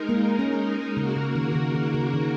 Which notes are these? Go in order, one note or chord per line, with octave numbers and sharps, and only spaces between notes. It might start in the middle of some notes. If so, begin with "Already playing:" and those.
Already playing: G#3 D#4 A#4
A#3
C#4
C#3 A#3 F#4 A#4
C#3
D#3
D#3
C#3
D#3
C#3
D#3